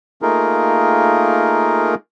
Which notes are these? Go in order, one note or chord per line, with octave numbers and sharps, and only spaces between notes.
A3 A#3 D#4 F4 G#4 A#4